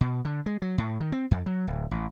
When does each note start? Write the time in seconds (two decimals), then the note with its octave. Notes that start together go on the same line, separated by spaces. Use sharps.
0.01 B2
0.25 D3
0.46 G#3
0.62 F#3
0.78 A2
1.00 D#3
1.12 C4
1.31 F2
1.46 F#3
1.67 D1
1.91 A1